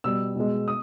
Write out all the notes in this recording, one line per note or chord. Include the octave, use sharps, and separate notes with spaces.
B2 G3 E6
B2 G#3
D#6